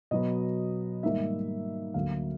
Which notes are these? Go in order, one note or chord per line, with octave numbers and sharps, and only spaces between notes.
B2 F#3 B3 D#5
G#2 D#3 G3 A#3 E5
D2 D3 F#3 A#3 F5